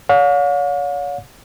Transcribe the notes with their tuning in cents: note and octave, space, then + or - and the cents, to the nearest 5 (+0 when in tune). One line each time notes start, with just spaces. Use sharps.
C#5 +40 F5 +45